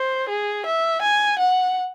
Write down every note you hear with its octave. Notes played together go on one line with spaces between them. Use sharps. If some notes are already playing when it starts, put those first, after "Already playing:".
Already playing: C5
G#4
E5
G#5
F#5